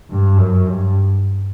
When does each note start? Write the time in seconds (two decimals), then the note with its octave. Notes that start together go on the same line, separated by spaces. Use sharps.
0.10 G2
0.38 F#2
0.67 G2